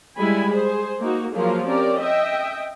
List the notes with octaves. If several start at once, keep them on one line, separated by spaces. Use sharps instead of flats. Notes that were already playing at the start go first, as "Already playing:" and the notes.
G3 G#3 E4 G#5 B5
G#4 C5
A#3 D#4 F#4
F3 F#3 A#3 F4 G#4 A#4
C4 C#4 G4 A#4 D5
D#5 E5 G5